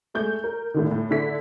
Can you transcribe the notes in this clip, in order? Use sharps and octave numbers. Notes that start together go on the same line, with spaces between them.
G#3 A3 G6
A#4
A2 D3 D#3
A2
D3 E4 A4 B6